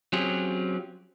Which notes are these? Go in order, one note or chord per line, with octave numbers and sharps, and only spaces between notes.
F#3 C4 C#4 F4 G4 G#4